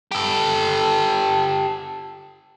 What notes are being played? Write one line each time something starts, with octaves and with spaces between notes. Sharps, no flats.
G4 A4